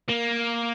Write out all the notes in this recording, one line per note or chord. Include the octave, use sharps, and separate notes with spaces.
A#3